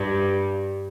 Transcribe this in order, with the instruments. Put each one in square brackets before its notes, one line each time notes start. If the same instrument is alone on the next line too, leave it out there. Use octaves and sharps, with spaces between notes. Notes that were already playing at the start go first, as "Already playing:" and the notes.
Already playing: [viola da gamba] G2 G3